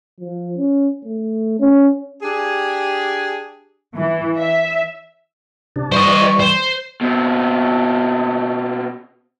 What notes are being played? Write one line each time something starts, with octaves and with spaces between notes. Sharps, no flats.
F3
C#4
A3
C#4
D4 G4 G#4
E3
E5
C3 D4
E3 G3 C5 D#5 C#6
C5
B2 C4